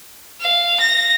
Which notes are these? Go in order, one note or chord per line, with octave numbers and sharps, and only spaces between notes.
F5
A#6